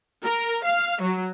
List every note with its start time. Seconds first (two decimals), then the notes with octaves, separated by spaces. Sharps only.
0.24 A#4
0.65 F5
1.02 F#3